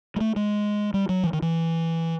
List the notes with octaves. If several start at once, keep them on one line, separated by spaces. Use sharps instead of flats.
G#3
A3
G#3
G3
F#3
E3
D#3
E3